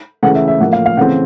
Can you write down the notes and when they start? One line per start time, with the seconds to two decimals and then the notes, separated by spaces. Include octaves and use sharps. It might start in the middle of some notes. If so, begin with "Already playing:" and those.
0.23 C#3 E3 A3 F#5
0.35 E5
0.48 E5
0.60 A2 F3 A#3 F#5
0.73 F5
0.86 F5
0.97 C#3 E3 A3 C4 F#5